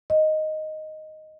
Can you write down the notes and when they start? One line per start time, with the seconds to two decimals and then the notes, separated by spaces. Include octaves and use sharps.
0.10 D#5